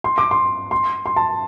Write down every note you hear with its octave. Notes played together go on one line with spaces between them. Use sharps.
C6
D6
C6
C6
C6
A5